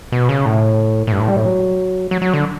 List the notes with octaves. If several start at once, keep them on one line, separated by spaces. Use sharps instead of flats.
B2
C#3
A2
A2
G2
A2
G3
A2
F#3
F#3
F#3
D3